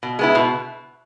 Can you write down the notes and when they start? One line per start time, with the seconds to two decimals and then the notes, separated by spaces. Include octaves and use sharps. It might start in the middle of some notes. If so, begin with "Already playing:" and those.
0.03 B2
0.19 G#3 B3 E4
0.35 B2